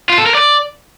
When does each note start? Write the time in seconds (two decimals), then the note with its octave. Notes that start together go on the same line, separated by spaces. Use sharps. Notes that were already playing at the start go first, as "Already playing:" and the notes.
0.10 F4
0.18 A4
0.26 A#4
0.35 D5